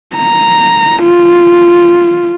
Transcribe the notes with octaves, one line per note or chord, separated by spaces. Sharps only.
A#5
F4